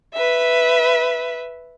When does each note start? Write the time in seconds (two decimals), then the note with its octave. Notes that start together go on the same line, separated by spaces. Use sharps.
0.14 B4 E5